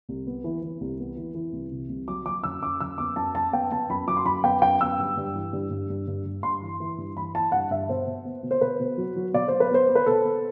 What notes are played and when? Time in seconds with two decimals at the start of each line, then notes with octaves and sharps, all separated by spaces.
0.09 C2
0.27 B3
0.44 E3
0.62 E3
0.81 C2
0.99 B3
1.16 E3
1.35 E3
1.53 C2
1.72 C3
1.89 C2
2.08 F#3 D6
2.26 F#3 D6
2.44 F#2 E6
2.62 F#2 D6
2.81 F#2 E6
2.98 B3 D6
3.16 F#2 A5
3.34 F#2 A5
3.52 B3 G5
3.71 B3 A5
3.89 F#2 B5
4.07 F#3 D6
4.17 C6
4.25 F#2 B5
4.44 B3 G5
4.62 F#2 G5
4.81 B3 E6
4.99 G2
5.17 G2
5.35 E3
5.53 G2
5.70 G2
5.90 G2
6.07 G2
6.26 G2
6.43 G2 C6
6.62 E3
6.80 E3
6.98 G2
7.17 E3 B5
7.35 E3 A5
7.52 G2 F#5
7.70 G2 E5
7.89 B2 C5
8.07 B2
8.25 B3
8.43 B2
8.51 C5
8.61 B2 B4
8.80 B2
8.97 F#3
9.16 F#3
9.34 B2 D5
9.48 B3 C5
9.60 B4
9.71 B3 C5
9.89 B3
9.95 B4
10.06 B2 A4
10.25 B3